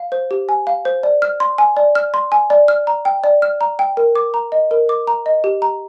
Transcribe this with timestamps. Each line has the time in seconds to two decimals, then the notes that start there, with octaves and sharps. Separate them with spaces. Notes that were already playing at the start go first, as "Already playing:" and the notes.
Already playing: F5
0.12 C5
0.31 G4
0.49 G#5
0.67 F5
0.85 C5
1.03 D5
1.22 F6
1.40 C6
1.58 G#5
1.77 D5
1.95 F6
2.14 C6
2.32 G#5
2.50 D5
2.68 F6
2.87 A#5
3.05 G5
3.24 D5
3.42 F6
3.61 A#5
3.79 G5
3.97 A#4
4.16 D6
4.34 A#5
4.52 D#5
4.71 A#4
4.89 D6
5.07 A#5
5.26 D#5
5.44 G4
5.62 A#5